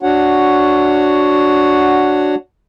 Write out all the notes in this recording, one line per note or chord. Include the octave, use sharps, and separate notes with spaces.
D4 F#4 C#5 F#5